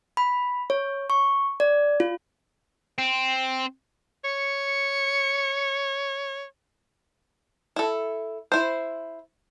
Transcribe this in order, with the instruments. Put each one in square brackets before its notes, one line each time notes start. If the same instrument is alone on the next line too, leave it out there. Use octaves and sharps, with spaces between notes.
[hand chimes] B5
C#5
C#6
D5
F4
[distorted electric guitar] C4
[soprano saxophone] C#5 [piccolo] C#7
[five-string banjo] E4 A4
E4 C5